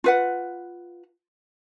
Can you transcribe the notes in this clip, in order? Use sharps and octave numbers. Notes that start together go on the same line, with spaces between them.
F4 B4 F#5